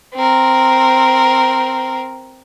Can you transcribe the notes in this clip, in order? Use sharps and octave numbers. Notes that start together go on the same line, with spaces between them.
C4 A#4